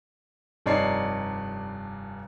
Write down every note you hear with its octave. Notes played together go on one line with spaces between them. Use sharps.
F1 G2 D#4 C#5 D5 C7